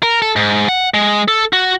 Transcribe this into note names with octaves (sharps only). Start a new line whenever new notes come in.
A#4
A4
G#2
F#5
G#3
A4
F#4